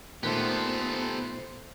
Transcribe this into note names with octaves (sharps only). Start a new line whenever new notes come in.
A#2 D#3 A3 B3 G4 A4 C5